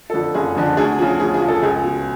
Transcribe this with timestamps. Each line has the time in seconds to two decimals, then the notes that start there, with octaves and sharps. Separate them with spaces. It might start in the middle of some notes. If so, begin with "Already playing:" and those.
0.10 F2 D3 F3 A4
0.34 F#1 G#4
0.56 F2 D3 F3
0.77 D2 G#4
0.98 C#3 F3
1.20 D2 G#4
1.34 G#4
1.41 C#3 F3
1.48 A4
1.63 C#2 G#4
1.84 B2